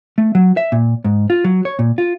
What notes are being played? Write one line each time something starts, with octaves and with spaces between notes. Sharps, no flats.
A3
F#3
E5
A#2
G#2
F4
F#3
C#5
A#2
F4